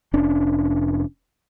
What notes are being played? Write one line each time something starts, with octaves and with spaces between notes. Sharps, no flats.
F1 C#4 D4